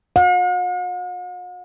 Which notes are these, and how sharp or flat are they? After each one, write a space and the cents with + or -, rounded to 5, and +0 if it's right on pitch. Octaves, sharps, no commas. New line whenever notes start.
F#5 -45